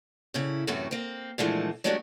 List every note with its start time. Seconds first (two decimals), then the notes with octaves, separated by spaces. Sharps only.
0.34 A2 C#3 E4
0.67 F#2 A2 C3 E3 A3 F#4
0.91 A#3 C4
1.38 A#2 D3 E3 F3 G#3 A3
1.84 F#3 G#3 A3 D4 F#4 G4